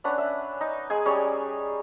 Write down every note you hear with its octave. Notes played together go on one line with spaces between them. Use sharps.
C#4 D4 B4 F#5
E5
D#4
G#3 G#4 G#5
G3 C#4 G#4 C#5